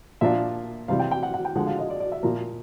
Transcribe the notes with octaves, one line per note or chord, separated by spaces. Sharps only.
A#2 F3 A#3 D4 F4 E5
C3 E3 G3 F5
G5
G5
F#5
F#5
G5
D3 F3 G#3 F#5
F5
D#5
D5
D5
E5
A#2 F3 A#3